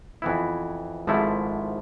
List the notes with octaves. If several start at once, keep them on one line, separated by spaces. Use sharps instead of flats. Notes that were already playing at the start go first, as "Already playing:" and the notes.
F2 E3 B3 E4
G#1 G#2 F3 A3 E4